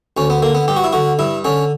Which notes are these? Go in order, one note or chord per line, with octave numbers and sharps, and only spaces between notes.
D2 C#4
B3
D3 A#3
B3
G2 G4
F#4
E4
D3 F#4
G2 E4
D3 C#4